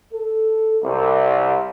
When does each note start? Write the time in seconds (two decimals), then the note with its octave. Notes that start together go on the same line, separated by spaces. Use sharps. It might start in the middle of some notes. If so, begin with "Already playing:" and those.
0.14 A4
0.83 C2